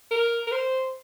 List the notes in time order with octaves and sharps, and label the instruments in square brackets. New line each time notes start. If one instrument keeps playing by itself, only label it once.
[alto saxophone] A#4
A#4
C5